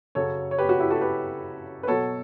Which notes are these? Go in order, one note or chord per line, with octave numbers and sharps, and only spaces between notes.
F#2 C#3 F#3 A4 C#5
C#5
G4 B4
F#4
E4 G4
F#4 A4
G4 B4
B4
B2 F#3 A4 C#5